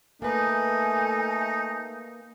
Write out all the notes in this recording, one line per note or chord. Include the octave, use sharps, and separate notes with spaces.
A3 A#3 D#4 B4 G#5